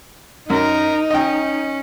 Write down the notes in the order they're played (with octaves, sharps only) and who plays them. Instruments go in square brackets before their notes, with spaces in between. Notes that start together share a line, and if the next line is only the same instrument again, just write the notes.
[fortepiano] F#2 [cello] D#4 [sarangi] A#4
[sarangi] C#4 [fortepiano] D#5 G5